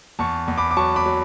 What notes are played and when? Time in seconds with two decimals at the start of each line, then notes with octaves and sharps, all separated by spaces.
0.19 E2 A5 C#6
0.48 E2
0.58 B5 D6
0.71 D6
0.77 F#3 A5 C#6
0.96 B5 D6
1.06 F#3